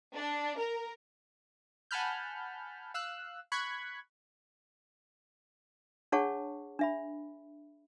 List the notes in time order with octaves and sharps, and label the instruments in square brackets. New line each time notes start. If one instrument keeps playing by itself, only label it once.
[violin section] D4
A#4
[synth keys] F#5 G#5 A5 B5 F6 G6
F5 E6 F#6
B5 C#6 F#6 G#6 B6
[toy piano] D4 G#4 C#5 F#5 A5 C#6
D4 E5 B5